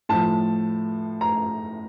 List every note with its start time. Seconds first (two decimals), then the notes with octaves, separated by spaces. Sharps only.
0.09 A2 F3 A5
1.21 A#5